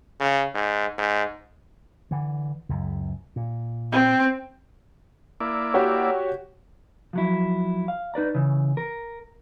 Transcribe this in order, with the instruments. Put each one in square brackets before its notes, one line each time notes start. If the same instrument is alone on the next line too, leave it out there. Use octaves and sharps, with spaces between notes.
[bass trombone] C#3
G#2
G#2
[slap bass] D3 E3
C#2 F#2
A#2
[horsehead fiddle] C4
[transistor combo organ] A#3 E4 D5
[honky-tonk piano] F#4 G4 C#5
[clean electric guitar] F3 F#3 E4
F5
D#4 B4 D5 A#5
C#3 E3
A#4